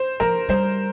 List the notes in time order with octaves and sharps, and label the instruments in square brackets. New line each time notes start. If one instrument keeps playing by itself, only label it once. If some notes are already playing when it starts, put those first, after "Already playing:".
Already playing: [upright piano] C5
[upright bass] F3 [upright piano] A#4
[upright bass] G3 [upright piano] C5